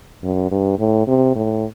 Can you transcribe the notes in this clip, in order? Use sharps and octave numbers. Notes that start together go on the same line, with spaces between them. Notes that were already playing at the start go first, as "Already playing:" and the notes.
F#2
G2
A2
C3
A2